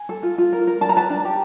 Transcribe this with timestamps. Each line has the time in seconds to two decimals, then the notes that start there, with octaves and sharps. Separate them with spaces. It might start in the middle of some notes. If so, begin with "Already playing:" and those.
Already playing: G#5
0.09 A4
0.23 F4
0.38 F4
0.53 A#4
0.67 A#4
0.81 D4 A5
0.89 A#5
0.96 B4 A5
1.10 D4
1.25 G4